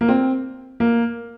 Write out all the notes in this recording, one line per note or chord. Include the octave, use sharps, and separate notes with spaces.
A#3
C4
A#3